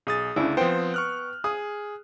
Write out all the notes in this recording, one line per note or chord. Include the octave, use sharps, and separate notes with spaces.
B1 G#4 D#6 A6
D2 C#3 D4 E4
F3 B3 C4 C5 G5
C#6 F6 F#6
G#4 D#6